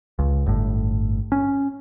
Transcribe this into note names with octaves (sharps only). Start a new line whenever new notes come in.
C#2
G1 A2
C#4